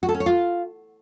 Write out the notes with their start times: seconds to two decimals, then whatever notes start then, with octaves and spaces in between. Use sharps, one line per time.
0.03 F#4
0.09 A4
0.14 C#4
0.20 C#5
0.26 F4